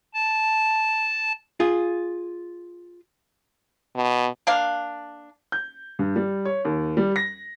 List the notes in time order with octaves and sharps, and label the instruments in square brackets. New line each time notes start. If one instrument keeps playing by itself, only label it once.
[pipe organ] A5
[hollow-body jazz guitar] F4 G#4
[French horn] B2
[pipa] A#3 D4 F5
[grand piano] G6
G2
G3
C#5
D#2
G3
A#6